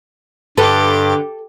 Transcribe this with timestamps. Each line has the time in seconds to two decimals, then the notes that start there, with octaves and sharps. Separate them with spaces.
0.58 G2 D3 G4 A4 B4 D6